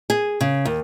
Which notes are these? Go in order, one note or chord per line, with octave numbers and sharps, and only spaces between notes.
G#4
C#3
D#2